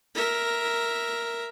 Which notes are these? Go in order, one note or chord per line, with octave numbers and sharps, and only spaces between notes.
A#4 E5